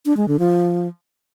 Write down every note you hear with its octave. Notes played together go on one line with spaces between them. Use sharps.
D4
G#3
D3
F3